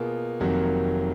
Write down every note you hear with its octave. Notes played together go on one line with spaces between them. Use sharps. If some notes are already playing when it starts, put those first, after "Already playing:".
Already playing: B2 A#3 F4 G#4
F1 F2 D#3 F#3 A#3